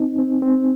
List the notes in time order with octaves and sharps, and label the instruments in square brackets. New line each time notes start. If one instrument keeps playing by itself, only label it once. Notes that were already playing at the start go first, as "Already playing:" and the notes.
Already playing: [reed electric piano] C4 D#4
C4
C4